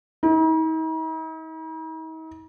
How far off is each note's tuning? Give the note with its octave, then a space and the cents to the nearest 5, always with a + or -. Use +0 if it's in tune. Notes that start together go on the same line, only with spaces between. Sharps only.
D#4 +45